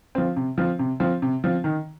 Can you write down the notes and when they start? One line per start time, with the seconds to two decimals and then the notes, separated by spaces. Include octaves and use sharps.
0.15 F3 C4
0.36 C3
0.58 F3 C4
0.79 C3
1.00 F3 C4
1.22 C3
1.44 F3 C4
1.64 D#3